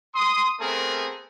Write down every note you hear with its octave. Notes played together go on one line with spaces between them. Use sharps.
C6 D#6
A3 B3 C4 G#4 A#4 C5